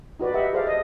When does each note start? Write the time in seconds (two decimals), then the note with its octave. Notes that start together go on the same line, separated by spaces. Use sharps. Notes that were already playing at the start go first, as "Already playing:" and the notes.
0.19 D#4 F#4 B4 D5
0.34 G4 B4 D#5 E5 F#5
0.53 G#4 A4 C5 D5 E5 F5
0.67 A4 D#5